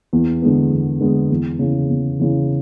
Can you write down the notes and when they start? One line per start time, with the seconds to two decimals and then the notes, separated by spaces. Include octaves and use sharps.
0.13 E2
0.42 D3 G#3 B3
0.72 E2
1.00 D3 G#3 B3
1.30 E2
1.59 C#3 E3
1.89 E2
2.19 C#3 E3